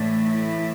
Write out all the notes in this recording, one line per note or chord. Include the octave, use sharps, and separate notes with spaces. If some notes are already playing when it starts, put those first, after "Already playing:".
Already playing: A2 E3 A3 D4
E4